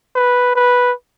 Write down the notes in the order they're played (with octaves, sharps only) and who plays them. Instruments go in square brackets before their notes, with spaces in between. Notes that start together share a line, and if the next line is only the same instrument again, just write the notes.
[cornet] B4
B4